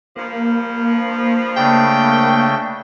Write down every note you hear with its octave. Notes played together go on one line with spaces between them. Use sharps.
G2 F3 A#3
C#3 A3 D4 G5